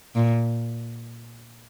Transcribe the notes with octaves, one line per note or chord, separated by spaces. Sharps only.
A#2